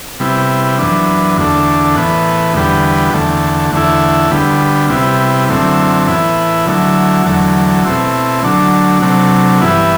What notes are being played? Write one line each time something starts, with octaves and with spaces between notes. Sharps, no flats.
C3 G3 B3 E4
F#2 E3 B3 D4
E2 D3 A3 D4
A2 E3 B3
E2 D3 G3 B3
E2 D3 A3
E2 D3 A3 E4
D2 D3 G3 B3
C3 G3 B3 E4
F#2 D3 A3 C4 E4
A2 E3 B3 E4
D3 F#3 A3 E4
E2 D3 F#3 A3
B2 A3 C4 E4
D3 F#3 A3 D4
C3 F#3 A3 D4
G2 E3 B3 E4